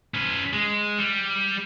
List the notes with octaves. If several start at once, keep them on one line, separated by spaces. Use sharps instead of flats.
C#4 B4
G#3
G3